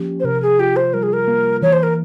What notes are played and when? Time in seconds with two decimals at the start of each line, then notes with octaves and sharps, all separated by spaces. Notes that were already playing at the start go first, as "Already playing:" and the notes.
Already playing: F3 A#3 C#4 G4
0.20 C5
0.24 C3 A#4
0.42 G#4
0.59 F4 G4
0.76 C5
0.94 G3 A#4
1.03 G#4
1.13 A#4
1.27 A#3
1.62 E3 C#5
1.73 C5
1.83 A#4